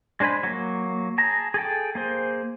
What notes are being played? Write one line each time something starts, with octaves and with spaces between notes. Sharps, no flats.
G#3 D4 C5 G#5 B5
F#3 A#3
G#4 A5 A#5
G#4 A4 G5
A#3 G#4 C5